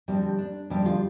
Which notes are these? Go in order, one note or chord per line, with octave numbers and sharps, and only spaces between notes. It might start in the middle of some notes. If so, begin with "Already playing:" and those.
F2 D3 G3 C4
D4
F2 D3 G3 G4
F4